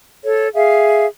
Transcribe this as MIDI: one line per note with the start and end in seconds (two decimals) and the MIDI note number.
0.24 0.48 69
0.24 0.48 73
0.55 1.05 68
0.55 1.05 76
0.55 1.05 77